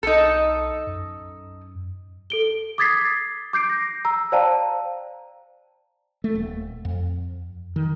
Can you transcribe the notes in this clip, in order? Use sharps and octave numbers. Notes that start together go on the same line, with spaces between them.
B1 D#4 A4
F#2
A4 D7 G7
D6 D#6 G#6 A6 B6 C7
D6 G6 C7 D7
A#6
A#5 E6
C5 D5 F5 G5 A5 A#5
A3
D#1
F2
D#3